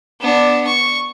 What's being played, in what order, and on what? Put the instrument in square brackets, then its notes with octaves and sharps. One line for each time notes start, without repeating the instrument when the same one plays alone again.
[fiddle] B3 D4
C#6